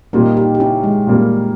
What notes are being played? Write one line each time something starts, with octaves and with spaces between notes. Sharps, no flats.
A#2 G3 A#3 D#4 G4
D#4 G4
G4
C#4 E4
G#3
A#2 G3 A#3